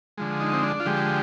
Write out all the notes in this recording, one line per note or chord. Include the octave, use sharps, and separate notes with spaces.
D3 F3 G#3
D#4
C4
D4
F4
D3 F3 G#3 G4